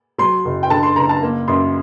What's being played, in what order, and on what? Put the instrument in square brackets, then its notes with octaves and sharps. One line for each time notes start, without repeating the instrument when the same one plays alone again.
[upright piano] F#3 C6
F#1
G5
D3 A5
C6
F#1 A#5
A5
A#3
F#2 C6